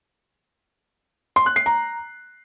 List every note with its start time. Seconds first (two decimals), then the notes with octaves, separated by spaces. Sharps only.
1.36 C6
1.46 F#6
1.56 C7
1.66 A#5